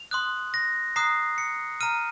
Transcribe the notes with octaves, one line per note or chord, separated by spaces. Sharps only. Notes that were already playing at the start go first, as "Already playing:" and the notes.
Already playing: F7
C6 D#6 F#6
A#6
A#5 D#6 F#6 C7
C#7
A#5 F6 D#7